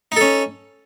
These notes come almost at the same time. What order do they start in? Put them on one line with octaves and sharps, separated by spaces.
D#4 A4 C#4